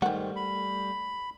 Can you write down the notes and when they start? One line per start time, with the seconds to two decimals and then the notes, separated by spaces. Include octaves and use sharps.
0.02 G#2 D#3 G3 A3 G4 F#5
0.36 B5